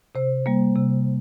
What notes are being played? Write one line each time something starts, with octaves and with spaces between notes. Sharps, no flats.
C3 C5
G3 A#3
C3